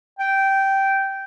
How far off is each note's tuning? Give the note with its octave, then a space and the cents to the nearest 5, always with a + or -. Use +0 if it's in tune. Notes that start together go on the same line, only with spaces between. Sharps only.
G5 -10